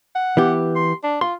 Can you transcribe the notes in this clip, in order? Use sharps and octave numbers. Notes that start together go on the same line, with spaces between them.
F#5
E3 B3 G4
C6
D4
F4 C6